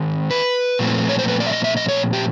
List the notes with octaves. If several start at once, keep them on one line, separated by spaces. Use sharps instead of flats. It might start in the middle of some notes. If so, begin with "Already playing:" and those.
Already playing: D#3 G#3 C4 C5
B4
A#2 F3 A3 C4
C#5
C5
B4
D5
E5
D#5
E5
D#5
C#5
G4